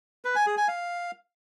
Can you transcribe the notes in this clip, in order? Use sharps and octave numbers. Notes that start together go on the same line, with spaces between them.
B4
G#5
G#4
G#5
F5